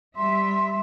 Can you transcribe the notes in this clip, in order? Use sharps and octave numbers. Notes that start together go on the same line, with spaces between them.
G3 E5 C6